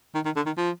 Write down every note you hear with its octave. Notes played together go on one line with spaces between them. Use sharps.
D#3
D#3
D3
D#3
F3